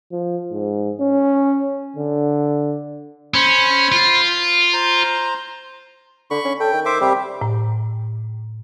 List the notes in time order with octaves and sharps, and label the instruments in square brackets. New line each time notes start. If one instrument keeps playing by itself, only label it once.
[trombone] F3
G#2
C#4
D3
[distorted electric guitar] C#4 [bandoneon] C5 B5
[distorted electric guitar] F4
[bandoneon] C5 A#5
[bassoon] D3 [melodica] B5 C#6
[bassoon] C#4
[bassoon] A4 [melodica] G5
[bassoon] D#3
[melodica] C5 E5 D6
[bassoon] C3 [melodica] G3 G4
[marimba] A2